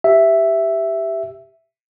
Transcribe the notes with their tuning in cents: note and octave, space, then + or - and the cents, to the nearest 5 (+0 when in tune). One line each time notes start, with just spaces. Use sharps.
G4 +0 E5 +0